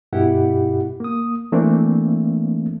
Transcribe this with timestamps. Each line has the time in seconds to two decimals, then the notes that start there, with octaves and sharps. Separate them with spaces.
0.13 G2 B2 E4 G4 F#5
1.00 A#3 D#6
1.52 E3 A3 A#3 C4 D4